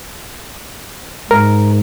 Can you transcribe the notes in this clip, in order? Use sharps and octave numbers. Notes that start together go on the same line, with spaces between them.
G#2 A#4